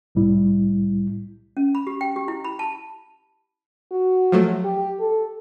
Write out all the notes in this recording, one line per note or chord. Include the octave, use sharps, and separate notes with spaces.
C2 A2 G3 E4
C#4
B5
G4
G5
G4
E4
B5
A5
F#4
F3 F#3 A3
G4
A4